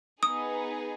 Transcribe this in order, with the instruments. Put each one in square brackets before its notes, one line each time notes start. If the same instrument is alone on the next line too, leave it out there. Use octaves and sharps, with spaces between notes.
[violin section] B3 D#4 G#4 [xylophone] D#6